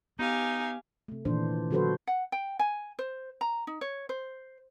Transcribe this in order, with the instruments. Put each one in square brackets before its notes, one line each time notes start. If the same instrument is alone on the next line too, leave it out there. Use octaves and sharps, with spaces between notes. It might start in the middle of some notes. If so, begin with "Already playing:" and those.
[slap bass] B3 [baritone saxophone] D#4 [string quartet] G4 F5 G#5
[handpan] C3 A3
A#2 D#3 E3 D4 C5
D3 F#3 F#4 A4 B4 C5
[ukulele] F#5
G5
G#5
C5
A#5
D#4
C#5
C5